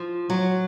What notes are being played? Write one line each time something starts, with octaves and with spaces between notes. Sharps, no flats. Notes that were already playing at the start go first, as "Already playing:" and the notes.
Already playing: F3
F#3